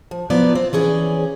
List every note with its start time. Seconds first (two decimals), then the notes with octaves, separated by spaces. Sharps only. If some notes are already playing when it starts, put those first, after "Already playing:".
0.11 F3
0.30 F3 F#3 B3 E4 B4 D5
0.55 C4
0.73 E3 C#4 G#4 D5